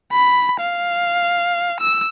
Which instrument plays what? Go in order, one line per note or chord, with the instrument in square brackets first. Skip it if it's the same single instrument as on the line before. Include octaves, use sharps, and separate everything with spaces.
[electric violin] B5
F5
E6